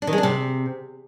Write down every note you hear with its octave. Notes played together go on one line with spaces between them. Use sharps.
D4
D#3
G#3
D4
C3